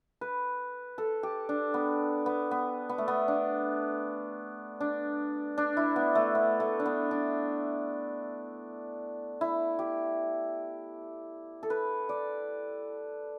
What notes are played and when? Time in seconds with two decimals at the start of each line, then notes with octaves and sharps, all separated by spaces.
0.21 B4
0.98 A4
1.23 G4
1.49 D4
1.74 B3
2.26 B3
2.51 B3
2.89 B3
2.98 A3
3.08 B3
3.28 D4
4.81 D4
5.58 D4
5.77 E4
5.96 B3
6.15 A3
6.35 B3
6.60 A3
6.80 D4
6.86 B3
7.11 D4
9.41 E4
9.79 G4
11.63 A4
11.70 B4
12.09 D5